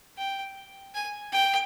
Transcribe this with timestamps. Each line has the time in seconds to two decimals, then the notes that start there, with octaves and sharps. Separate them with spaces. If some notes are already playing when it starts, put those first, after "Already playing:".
0.17 G5
0.94 G#5
1.32 G5